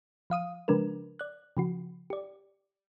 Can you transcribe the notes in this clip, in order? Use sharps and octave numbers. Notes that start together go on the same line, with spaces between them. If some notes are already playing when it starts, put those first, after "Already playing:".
F3 F5 D#6 D#7
C#3 F3 G#3 D4 A#4 B4
D5 F#6
C#3 F3 F#4
G4 D5